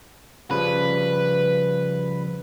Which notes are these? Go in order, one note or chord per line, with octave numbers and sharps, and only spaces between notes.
C#3 F3 G3 B4